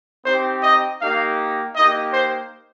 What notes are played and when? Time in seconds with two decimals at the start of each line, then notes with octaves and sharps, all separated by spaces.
0.24 C4 D#4 G4 C5
0.63 D#5
1.00 A#3 D#4 G4 F5
1.76 A#3 D#4 G4 D#5
2.13 C5